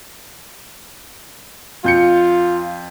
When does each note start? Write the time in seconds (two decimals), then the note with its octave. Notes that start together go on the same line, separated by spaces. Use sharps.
1.84 F2 F4 G6 C#7